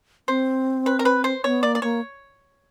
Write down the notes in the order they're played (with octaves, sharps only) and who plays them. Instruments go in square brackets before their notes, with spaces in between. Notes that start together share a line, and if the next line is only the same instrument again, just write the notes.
[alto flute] C4 [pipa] C5
[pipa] B4
A#4
B4
C5
[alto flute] B3 [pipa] C#5
[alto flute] A#3 [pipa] D5
[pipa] D5
[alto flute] A#3 [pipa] C#5